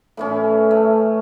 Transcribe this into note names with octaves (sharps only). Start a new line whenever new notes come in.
A2 E3 C#4
A3